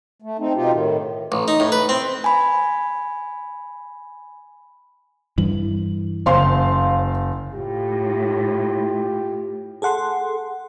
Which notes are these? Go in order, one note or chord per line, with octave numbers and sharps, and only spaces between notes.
A3
C4 D#4
B2 D#4 F4 G4
A2 D#3
A1
D#4
A2
B4
C4
G#5 B5
G2 E3 F#7
F#1 C5 F5 C6
A2 F4 G4
G#4 A4 F#5 C6